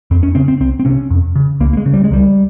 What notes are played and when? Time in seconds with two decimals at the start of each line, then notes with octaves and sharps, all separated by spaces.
0.11 F2 C4
0.23 C#4
0.35 C#3 C4
0.48 C4
0.60 C2 C4
0.80 C4
0.85 C3 C#4
1.10 F2
1.36 C#3
1.60 C#2 A#3
1.73 A#3
1.77 G#3
1.86 C#3
1.94 G3
2.04 G#3
2.11 C#2 G3